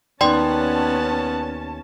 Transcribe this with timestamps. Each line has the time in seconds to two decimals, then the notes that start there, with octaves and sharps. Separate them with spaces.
0.21 D#2 B3 C#4 D5 F#5 G5 A5 C6